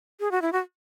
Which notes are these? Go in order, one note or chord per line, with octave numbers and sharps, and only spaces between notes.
G#4
F#4
E4
F#4